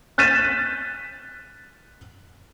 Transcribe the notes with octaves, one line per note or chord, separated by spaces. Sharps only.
F#6 G6 A6 B6 D#7 E7